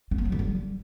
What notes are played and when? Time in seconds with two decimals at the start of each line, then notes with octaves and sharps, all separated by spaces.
0.11 C4
0.18 A#3
0.25 F#3
0.32 D3
0.39 G3